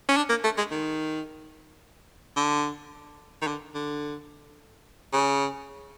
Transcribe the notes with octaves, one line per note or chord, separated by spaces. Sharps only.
C#4
D4
A#3
A3
G#3
D#3
D3
D#3
D3
D3
C#3